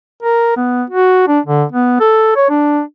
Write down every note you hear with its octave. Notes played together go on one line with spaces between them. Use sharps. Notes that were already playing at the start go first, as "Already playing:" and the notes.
A#4
B3
F#4
D4
D3
B3
A4
C#5
D4